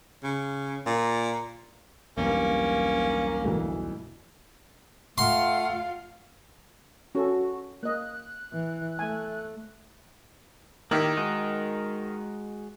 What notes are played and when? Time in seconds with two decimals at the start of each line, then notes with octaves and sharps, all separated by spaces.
0.24 C#3
0.87 A#2
2.18 B1 E2 G2 A#3 C#4
3.44 D2 B2 E3
5.18 A3 F4 F5 F#5 C6
7.15 C#4 F#4 A4
7.83 A#3 D#5 F#6
8.53 E3
8.99 A3 G#5
10.91 D#3 A#3 E4 G4
11.17 G#3 F#4 D#5